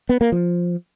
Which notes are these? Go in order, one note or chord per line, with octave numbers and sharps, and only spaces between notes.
B3
A#3
F3